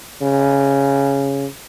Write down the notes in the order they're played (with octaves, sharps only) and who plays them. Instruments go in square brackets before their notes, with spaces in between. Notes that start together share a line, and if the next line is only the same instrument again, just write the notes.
[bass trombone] C#3